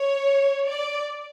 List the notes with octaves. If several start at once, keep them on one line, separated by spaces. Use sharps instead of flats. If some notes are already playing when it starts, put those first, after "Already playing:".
Already playing: C#5
D5